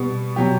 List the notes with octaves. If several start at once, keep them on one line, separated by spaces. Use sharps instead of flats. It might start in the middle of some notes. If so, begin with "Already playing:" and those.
Already playing: B2 G3 B3
B2 F#3 G4